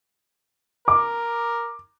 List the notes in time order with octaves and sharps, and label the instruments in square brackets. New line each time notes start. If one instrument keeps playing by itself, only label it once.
[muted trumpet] A#4 [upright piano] D6